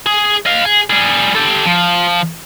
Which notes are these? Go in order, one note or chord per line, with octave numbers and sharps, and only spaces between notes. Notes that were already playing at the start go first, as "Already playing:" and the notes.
G#4
D#5 F5
G#4
G3 G#4
G4 A4
F3